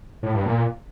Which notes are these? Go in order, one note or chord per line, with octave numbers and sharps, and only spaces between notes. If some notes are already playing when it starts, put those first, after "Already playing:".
A2
G2
A#2